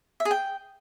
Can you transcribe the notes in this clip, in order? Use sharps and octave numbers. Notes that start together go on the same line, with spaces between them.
E5
G#4
G5